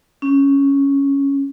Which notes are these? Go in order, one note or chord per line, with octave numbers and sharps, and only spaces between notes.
C#4